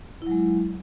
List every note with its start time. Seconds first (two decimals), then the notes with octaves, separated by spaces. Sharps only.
0.22 E4
0.27 F#3
0.31 G#3